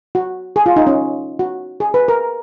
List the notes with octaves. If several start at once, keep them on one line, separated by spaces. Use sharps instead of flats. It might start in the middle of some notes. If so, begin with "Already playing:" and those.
F#4
G#4
F4
D#4
C#4
F#4
G#4
B4
A#4